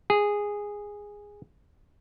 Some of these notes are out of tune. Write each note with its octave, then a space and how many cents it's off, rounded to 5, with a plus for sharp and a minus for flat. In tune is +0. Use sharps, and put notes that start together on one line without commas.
G#4 -10